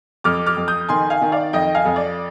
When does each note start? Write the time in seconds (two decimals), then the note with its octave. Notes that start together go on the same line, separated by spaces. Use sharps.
0.24 F2 D6 F6
0.46 D6 F6
0.57 F2
0.68 D#6 G6
0.89 D#3 G#5 C6
1.10 F5 G#5
1.22 D#3
1.32 D5 F5
1.53 F2 D#5 G5
1.75 F5 G#5
1.85 F2
1.96 D5